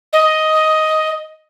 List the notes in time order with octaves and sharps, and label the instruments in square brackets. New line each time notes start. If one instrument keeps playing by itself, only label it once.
[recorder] D#5